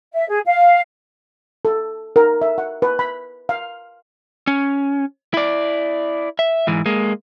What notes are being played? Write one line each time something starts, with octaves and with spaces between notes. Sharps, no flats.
E5
G#4
F5
A4
A#4
E5
F#5
B4
B5
F5
C#4
E4 D5
E5
G#2 E3
G#3 A#3